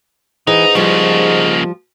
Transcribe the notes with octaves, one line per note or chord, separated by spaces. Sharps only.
G#2 E3 D#4
C#3 F3 G3 A#3